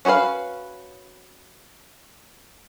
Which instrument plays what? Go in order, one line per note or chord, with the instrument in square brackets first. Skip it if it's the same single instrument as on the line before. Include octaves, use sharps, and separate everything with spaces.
[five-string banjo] C#4 F#4 G#4 B4 F5